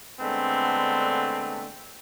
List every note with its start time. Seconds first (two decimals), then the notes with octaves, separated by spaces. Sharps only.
0.20 D3 G#3 A3 B3 C4 D4